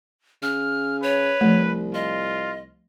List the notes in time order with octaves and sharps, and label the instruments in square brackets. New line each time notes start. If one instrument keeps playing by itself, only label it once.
[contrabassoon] C#3 [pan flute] F6
[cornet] B4 [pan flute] C#5
[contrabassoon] C2 [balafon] F3 A3
[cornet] F4 [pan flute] D#5